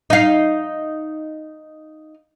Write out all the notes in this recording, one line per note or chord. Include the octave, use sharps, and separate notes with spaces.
D#4 F5